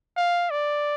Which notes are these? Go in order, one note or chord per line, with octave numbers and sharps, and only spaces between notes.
F5
D5